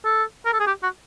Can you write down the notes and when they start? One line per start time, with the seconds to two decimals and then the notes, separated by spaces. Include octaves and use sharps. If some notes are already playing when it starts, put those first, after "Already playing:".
0.05 A4
0.46 A#4
0.53 A4
0.60 G#4
0.67 G4
0.83 F#4